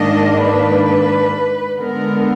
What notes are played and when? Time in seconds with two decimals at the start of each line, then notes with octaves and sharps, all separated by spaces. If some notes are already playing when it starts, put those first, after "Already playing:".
Already playing: G#2 D#3 A#3 D4 D#5
0.45 B4
1.77 D3 G#3 B3 A#4